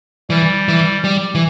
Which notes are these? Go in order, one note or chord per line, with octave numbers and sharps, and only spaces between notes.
E3 G3
E3
G3
E3